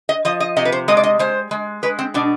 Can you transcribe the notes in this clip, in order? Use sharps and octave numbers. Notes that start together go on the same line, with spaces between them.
D#5
F3 D#5
D#5
C3 D#5
B4
C5
G#3 D#5
D5
D#5
G#3 C5
G#3
G#3 B4
C4
B2 D4